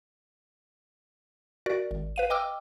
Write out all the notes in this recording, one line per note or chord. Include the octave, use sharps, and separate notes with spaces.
F#4 A#4 D5
G#1
B4 F5 D#7
D#5 G5 D6 E6 F6